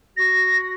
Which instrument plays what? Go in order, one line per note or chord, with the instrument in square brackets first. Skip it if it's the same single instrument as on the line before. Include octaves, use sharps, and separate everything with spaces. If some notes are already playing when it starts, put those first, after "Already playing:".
[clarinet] F#4 [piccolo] A#6